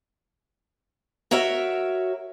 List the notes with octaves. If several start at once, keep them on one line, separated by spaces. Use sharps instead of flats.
F#4 A#4 C#5 E5